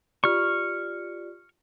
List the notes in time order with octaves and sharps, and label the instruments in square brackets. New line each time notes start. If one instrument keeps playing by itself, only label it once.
[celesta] F4 G4 D5 [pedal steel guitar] C#6 F6